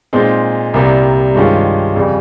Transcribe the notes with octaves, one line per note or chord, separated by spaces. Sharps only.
A#2 G#3 C4 D#4
C2 C3 G3 A#3
G2 D#3 G#3 C#4 F4
F2 C#3 G3